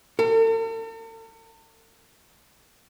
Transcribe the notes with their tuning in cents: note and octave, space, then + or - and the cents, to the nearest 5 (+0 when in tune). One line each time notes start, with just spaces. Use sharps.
A4 +45